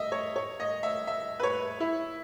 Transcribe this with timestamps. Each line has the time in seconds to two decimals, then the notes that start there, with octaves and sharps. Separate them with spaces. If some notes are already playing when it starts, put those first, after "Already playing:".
Already playing: D#5 E5
0.12 C#5
0.36 C#5
0.60 D#5
0.83 E5
1.07 E5
1.40 B4
1.43 C#5
1.80 E4